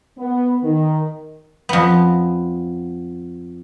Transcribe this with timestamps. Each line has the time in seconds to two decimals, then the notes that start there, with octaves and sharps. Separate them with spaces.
0.17 B3
0.62 D#3
1.69 F2 B3